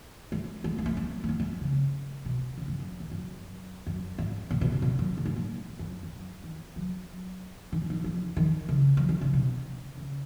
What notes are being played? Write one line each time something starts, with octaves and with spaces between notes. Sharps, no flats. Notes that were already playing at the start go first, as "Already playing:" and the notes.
G#3
G#3
G#3
A#3
G#3
G#3
A#3
G#3
C#3
B2
C#3
G#2
F#2
F#2
F#2
F#2
G#2
A#2
B2
C#3
B2
F#2
A#2
G#2
A#2
F#2
F2
F#2
D#3
F#3
D#3
F3
D#3
F3
D#3
C#3
F3
D#3
C#3
B2
C#3